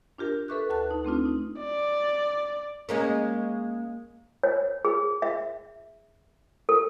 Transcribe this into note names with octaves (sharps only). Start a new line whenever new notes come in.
D4 F4 G4 A#4
A4 B4 E5 C#6 D6 F#6
D2 A4 A5 F#6
D#4 A5
A3 C4 D4 F4
D#4
D5
G#3 A#3 C#4
C#5
G#4
E5
A4